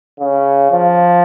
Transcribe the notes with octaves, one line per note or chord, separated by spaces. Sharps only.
C#3
F3